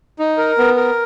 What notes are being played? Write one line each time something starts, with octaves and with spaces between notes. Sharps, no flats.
D#4
A#4
B3
A#4